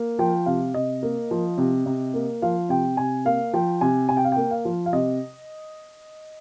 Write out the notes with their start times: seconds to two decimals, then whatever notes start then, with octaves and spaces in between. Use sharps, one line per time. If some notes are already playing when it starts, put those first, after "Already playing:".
Already playing: A#3
0.19 F3 G5
0.46 C3 F5
0.74 C3 D#5
1.03 A#3
1.31 F3
1.58 C3
1.86 C3
2.14 A#3
2.42 F3 F5
2.69 C3 G5
2.97 C3 G#5
3.25 A#3 F5
3.53 F3 G5
3.81 C3 G#5
4.09 C3 G#5
4.17 G5
4.25 F5
4.32 A#3 G5
4.51 F5
4.65 F3
4.86 F5
4.93 C3 D#5